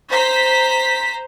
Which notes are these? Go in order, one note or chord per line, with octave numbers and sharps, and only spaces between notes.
C5 A#5 B6